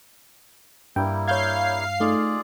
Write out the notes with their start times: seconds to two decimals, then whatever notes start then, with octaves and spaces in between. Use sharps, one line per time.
0.96 G2 G3 A#3 E4 G5
1.28 C#5 F5 G6 G#6 C7
2.00 A3 D#4 F4 G#4 D5